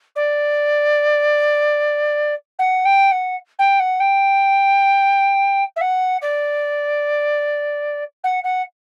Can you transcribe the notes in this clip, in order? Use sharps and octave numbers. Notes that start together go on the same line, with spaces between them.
D5
F#5
G5
F#5
G5
F#5
G5
E5
F#5
D5
F#5
F#5